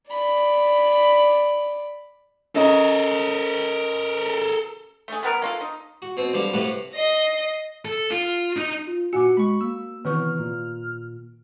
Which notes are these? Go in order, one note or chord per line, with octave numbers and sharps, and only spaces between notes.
D5 B5
C#4 A4 A#4 D#5
A3 G#4
G3 B3 A#4
A#3 F4 A4
D#4
F#4
B2 C4
D3 F3 G3
A2 C3 A3 F#4 B4 F5
D#5 A#6 C7
A4
F4
D#4 D#5
F4
A#2 F#4 F#5 G#5 D6 C#7
G#3 B5 C#6
A#3 E6
C3 D#3 E3 B3 B4 C#6 F6
A#2